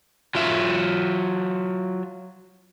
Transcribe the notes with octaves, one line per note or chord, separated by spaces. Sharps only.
F#3 F4 E5